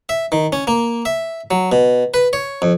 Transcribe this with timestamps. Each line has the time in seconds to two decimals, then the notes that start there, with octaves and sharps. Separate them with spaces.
0.09 E5
0.32 D#3
0.53 C#4
0.67 A#3
1.05 E5
1.51 F#3
1.72 B2
2.14 B4
2.33 C#5
2.62 F2